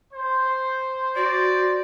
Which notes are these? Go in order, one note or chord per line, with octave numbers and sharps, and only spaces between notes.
C5
F#4 D5